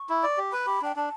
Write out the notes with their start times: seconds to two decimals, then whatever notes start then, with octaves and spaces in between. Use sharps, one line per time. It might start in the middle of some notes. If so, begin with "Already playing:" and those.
Already playing: C#6
0.09 E4
0.23 D5
0.37 G4
0.52 B4 B5
0.66 G4
0.82 D4 G5
0.96 D4 A5